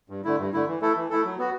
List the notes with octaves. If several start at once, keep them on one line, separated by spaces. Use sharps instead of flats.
G2
D3 A3 E4
G2
D3 A3 E4
E3
A3 E4 A4
E3
A3 E4 A4
F#3
B3 F#4